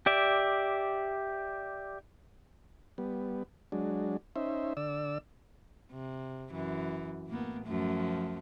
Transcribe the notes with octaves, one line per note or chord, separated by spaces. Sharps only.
G4 D5 E5
G3 B3
F#3 G#3 D4
C#4 D#4 C5 E5
D3 D5 E6
C3
F#2 E3
A2 A#3 B3
F#2 F3 A3